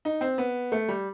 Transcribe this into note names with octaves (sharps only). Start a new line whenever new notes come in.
D#4
C4
B3
A3
G3